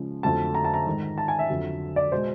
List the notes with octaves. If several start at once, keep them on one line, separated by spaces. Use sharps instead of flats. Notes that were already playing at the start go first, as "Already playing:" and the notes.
Already playing: C#3 F3 G#3
F2 D3 F#3 A3 A5
A#5
A5
A#5
G#2 D#3 G#3
A5
G#5
E5
F2 D3 F#3
D5
B2 G#3 C5